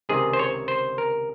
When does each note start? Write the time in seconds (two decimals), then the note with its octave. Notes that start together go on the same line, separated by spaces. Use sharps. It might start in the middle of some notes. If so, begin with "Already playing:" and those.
0.09 C#2 C3 D#3 G#4
0.33 C5
0.39 C#5
0.68 C5
0.98 A#4